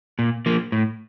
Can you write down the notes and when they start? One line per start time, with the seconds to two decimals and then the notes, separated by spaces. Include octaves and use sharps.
0.19 A#2
0.46 F3 A#3
0.72 A2